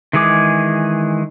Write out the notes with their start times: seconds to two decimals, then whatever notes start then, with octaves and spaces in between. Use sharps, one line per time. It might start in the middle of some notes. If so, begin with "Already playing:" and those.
0.13 D#3 E3 G#3 G#4 D6